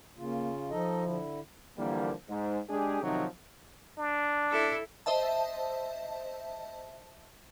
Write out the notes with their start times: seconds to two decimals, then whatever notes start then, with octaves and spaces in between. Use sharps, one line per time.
0.17 C#3 A#3 F4
0.70 F3 D#4 A4 D#5
1.04 D3 E4
1.78 D3 E3 F3 G3 A#3
2.29 G#2
2.70 G#3 D4 G4 G#4
3.03 C3 D#3 F3 F#3 D#4 F#4
3.98 D4
4.51 E4 A4
5.06 C5 D#5 E5 A5